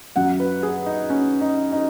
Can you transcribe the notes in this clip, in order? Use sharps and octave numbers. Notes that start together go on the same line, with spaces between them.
F#2 F#3 F#5
B4
G#4
D#4
C#4
D#4
D#4